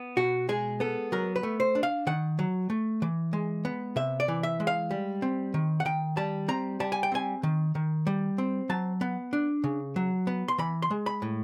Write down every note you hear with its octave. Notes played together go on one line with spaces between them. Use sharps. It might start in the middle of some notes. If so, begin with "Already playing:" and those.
Already playing: B3
B2 F#4
G#3 G#4
B3 A4
F#3 A#4
B4
A3
C5
D4
F5
D#3 F#5
F#3
A3
E3
G#3
B3
C3 E5
D5
E3
E5
G#3
F5
G3
C4
D#3
F#5
D#3 G5
G3 A5
C4 A#5
G3 A5
G#5
G5
C4 G#5
D#3
D#3
G3
C4
F#3 A5
B3
D4
C#3
F#3
B3
C6
E3 B5
C6
G#3
B5
A2